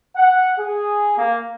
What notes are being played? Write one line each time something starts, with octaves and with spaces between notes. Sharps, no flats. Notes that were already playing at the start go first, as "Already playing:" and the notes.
F#5
G#4
A#3